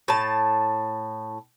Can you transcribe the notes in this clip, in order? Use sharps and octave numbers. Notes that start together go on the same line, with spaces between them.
A2 A5